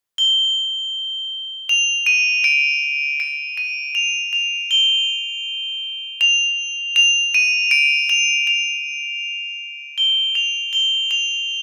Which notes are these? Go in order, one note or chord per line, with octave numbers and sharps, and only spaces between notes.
G7
F7
D#7
D7
D7
D#7
F7
F7
G7
F7
F7
D#7
D7
F7
F7
G7
F7
G7
F7